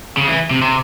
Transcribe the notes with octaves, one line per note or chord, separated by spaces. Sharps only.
C#3
E3
C3
C3